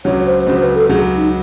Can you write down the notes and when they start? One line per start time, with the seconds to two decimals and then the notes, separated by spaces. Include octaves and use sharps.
0.05 C#2 C#3 F#3 C#5
0.26 C5
0.47 C#2 C#3 F#3 C5
0.61 B4
0.75 A4
0.89 C#2 C#3 F#3 G#4
1.17 D#4